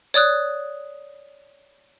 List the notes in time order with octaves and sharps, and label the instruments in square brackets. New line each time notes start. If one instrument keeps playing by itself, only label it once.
[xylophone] C#5 D5 D#6 F#6